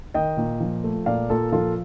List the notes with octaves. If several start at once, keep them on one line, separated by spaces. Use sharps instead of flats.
D#3 D#5 G5
A#2
F3
A3
A#2 D5 F5
A#2 F4 A4
F3 F4 A4